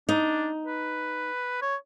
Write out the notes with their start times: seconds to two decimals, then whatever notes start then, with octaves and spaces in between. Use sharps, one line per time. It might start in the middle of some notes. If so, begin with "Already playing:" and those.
0.09 D4 D#4
0.67 B4
1.62 C#5